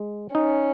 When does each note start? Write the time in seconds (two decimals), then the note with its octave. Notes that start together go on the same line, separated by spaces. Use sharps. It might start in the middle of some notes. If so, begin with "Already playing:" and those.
Already playing: G#3
0.35 C#4 D#4